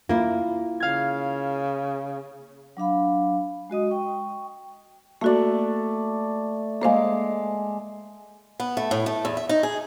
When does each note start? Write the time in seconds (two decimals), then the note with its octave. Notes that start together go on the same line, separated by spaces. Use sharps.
0.09 A#3 E4 F4
0.80 C#3 F5 G#6
2.77 F#3 D4 F5 B5
3.70 G#3 F#4 D#5 D#6
3.90 G5 C#6
5.21 A3 A#3 F#4 D5
6.81 G#3 A#3 C5 F5 D6
8.60 B3
8.77 A3
8.91 A2
9.06 A3
9.25 E2
9.37 E5
9.49 D#4
9.63 G#4